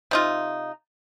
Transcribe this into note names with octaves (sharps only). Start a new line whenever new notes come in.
C3 D#4 F4